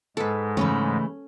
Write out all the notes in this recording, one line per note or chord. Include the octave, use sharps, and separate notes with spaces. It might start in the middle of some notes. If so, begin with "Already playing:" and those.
G#2 G#3 A4 B4
C#3 E3 A3 C#4